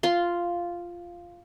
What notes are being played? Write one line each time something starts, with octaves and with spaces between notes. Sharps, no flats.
F4 C6